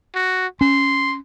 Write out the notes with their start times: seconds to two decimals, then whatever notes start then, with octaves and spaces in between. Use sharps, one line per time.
0.15 F#4
0.61 C#4 C6